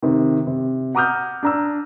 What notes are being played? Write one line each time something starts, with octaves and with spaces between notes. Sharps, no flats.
C3 D#3
C3
F#5 A#5 D6 D#6 F6 G6
D4 A#5 E6